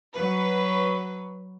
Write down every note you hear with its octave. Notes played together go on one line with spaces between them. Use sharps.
F#3 B4